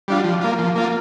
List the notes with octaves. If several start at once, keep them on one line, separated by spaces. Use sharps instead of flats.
G3 D4 F4
F3
A#3 F4
F3
A#3 F4